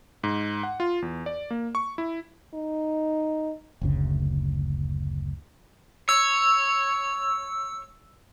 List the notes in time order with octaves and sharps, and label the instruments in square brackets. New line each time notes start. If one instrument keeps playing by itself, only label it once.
[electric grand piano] G#2
F#5
F4
E2
D5
A#3
C#6
E4
[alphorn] D#4
[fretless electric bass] F#1 D2 C#3
[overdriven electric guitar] C#5 [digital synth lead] E6